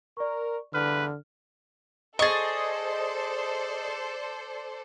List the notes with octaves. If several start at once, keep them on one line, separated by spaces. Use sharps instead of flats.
A#4 D5 C#6
E2 G2 D3 E3 B4 F6
G#4 A4 C5 D5 D#5 C#6 A6